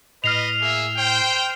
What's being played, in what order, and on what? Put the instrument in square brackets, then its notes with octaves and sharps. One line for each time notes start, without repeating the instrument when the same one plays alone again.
[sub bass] A2 [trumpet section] B4 D#5 [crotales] F6 C7 F7
[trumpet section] A#3 G#4 E5
C5 G5